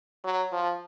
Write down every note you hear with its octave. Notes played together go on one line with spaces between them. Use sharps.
F#3
F3